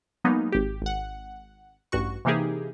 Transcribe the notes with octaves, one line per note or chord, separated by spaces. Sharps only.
F#3 G#3 A#3 B3 D#4
G#1 G4
G#1 F#5
A1 G2 F#4 C#6
C3 E3 A#3 D#4 G4 G#4